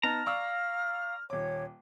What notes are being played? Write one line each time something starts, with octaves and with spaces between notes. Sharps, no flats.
B3 D#4 A5 A#5 F6
D5 F5 C#6 E6
D#1 C#5 D6